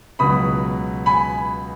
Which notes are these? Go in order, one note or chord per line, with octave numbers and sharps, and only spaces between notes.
C#2 B2 F#3 B5 D#6
G#5 B5